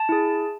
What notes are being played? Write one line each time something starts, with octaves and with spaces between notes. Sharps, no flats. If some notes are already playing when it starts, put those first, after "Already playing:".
Already playing: A5
E4 G#4